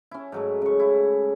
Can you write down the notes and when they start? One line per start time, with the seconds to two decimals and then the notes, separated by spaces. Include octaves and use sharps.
0.11 C#4 E4
0.32 G#2 F#3 A3
0.62 C#3 C#6
0.79 E4